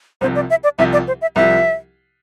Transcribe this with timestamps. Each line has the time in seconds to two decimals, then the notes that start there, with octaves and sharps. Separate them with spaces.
0.21 C2 C3 F3 C5
0.35 D5
0.50 E5
0.64 D5
0.79 C2 C3 F3 E5
0.93 D5
1.08 C5
1.22 E5
1.36 C2 C3 F3 E5